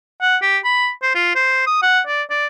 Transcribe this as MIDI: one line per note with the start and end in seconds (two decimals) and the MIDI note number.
0.22 0.37 78
0.42 0.58 67
0.65 0.90 83
1.03 1.10 72
1.15 1.34 65
1.35 1.65 72
1.67 1.79 87
1.82 2.00 78
2.07 2.23 74
2.30 2.47 74